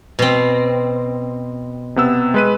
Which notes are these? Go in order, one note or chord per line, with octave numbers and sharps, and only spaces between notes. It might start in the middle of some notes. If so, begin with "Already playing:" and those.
B2 C4
C3 B3 E6
G#3 B4 D#7